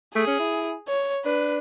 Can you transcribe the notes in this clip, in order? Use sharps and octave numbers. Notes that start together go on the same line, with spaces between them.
A3 G#4
C#4
E4
C#5
D4 B4